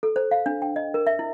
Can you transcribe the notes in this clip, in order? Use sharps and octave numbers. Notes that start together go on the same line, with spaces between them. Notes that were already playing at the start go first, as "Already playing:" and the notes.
A4
C5
F5
D4
G5
D#5
A#4
E5
E4